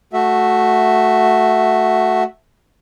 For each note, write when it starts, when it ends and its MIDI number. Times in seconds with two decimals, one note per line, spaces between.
0.13 2.23 57
0.13 2.23 66
0.13 2.23 76